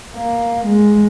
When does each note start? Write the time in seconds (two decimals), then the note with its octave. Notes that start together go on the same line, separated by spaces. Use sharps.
0.14 A#3
0.66 G#3